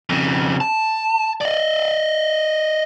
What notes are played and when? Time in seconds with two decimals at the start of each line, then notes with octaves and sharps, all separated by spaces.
0.10 F2 C#3
0.61 A5
1.41 D5 D#5